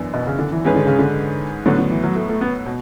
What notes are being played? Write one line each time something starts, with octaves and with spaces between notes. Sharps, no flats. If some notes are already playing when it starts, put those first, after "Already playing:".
Already playing: F#2 E3 B3 D4
B2
C#3
D3
E3
G#2 E3 G#3 C#4 G#4 B4
D3
C#3
D3
A2 D3 F#3 B3 F#4
D3
E3
F#3
A3
A3
B3
B2